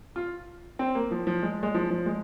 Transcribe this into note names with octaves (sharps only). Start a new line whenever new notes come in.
F4
C4
A#3
F3
F3
G#3
G#3
F3
F3
G#3